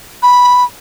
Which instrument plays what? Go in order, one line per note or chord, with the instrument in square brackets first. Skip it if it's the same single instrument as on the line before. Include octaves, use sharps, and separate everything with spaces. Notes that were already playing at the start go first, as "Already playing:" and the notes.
[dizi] B5